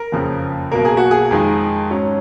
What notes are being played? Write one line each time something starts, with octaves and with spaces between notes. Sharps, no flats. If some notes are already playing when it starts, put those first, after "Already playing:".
Already playing: A#4
F#1 F2 C#3 F3
B1 B2 A#3 A#4
G#4
F#4
G#4
F2 D#3 G#3 D#4
G#2 F#3 C#4